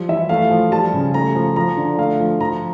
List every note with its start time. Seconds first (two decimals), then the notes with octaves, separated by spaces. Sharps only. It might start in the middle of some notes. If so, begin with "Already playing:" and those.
Already playing: F3 G3
0.08 E3 E5
0.29 A3 F5
0.51 F3
0.71 G3 A5
0.94 C#3
1.14 A3 A#5
1.35 F3
1.56 F3 A#5
1.77 D3
1.98 A3 F5
2.20 F3
2.40 F3 A#5